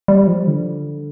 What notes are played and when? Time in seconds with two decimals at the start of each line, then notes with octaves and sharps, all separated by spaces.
0.08 G3
0.27 F3
0.47 D3